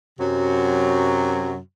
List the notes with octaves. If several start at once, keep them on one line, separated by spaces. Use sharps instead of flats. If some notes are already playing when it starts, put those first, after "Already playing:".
F#2 C3 F#3